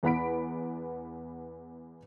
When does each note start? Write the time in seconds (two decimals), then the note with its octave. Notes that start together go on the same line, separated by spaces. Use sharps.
0.03 E2 B3 F#5 B5 B6 D7